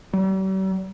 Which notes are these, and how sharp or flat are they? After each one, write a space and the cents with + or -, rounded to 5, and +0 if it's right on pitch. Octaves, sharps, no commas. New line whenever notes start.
G3 -45